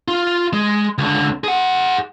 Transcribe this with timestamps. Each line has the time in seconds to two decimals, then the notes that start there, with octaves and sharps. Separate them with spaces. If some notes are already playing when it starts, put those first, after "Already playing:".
0.08 F4
0.53 G#3
0.98 C#2 D3
1.44 G#4 F#5